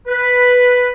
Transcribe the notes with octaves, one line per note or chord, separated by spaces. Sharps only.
B4